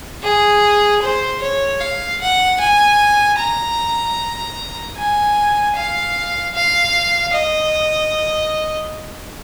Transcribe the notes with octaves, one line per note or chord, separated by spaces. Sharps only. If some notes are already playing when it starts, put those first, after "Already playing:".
G#4
C5
C#5
F5
F#5
G#5
A#5
G#5
F5
F5
D#5